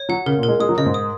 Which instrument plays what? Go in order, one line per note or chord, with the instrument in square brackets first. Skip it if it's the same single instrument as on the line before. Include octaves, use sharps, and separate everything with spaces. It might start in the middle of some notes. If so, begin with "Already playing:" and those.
Already playing: [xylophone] C#5
[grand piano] F#3 [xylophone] F#5
[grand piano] C#3 [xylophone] A#4
[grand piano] A#2
[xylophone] A#4
[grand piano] G#3
[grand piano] G#3 [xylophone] D#6
[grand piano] F#3
[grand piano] C#3 [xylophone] D#5
[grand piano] G#2
[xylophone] D#6